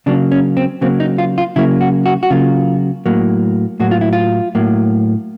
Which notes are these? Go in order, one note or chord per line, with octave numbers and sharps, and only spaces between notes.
C#3 F#3 A#3 D4
C#4
C4
C#3 F#3 A#3 C4
D#4
F4
F4
C#3 F#3 A#3 E4
F#4
F#4
F#4
C#3 F#3 A#3 F4
A2 F#3 A#3
A2 F#3 A#3 F#4
F4
E4
F4
A2 F#3 A#3